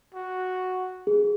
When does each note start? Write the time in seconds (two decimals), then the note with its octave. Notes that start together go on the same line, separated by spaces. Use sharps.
0.14 F#4
1.07 G#4